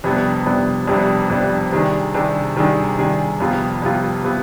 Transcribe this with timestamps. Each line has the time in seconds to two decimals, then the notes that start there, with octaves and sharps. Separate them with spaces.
0.04 F2 C3 G3 B3 D4
0.46 F2 C3 G3 B3 D4
0.88 F2 C3 G3 B3 D4
1.30 F2 C3 G3 B3 D4
1.72 C3 D#3 G3 D4 G#4
2.14 C3 D#3 G3 D4 G#4
2.56 C3 D#3 G3 D4 G#4
2.98 C3 D#3 G3 D4 G#4
3.40 F2 C3 G3 B3 F4
3.82 F2 C3 G3 B3 F4
4.24 C3 G3 B3 F4